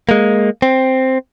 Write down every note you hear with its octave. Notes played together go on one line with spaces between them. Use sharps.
G#3 A#3
C4